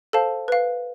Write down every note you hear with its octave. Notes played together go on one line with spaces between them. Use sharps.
A4 C5 F5 A5
B4 F5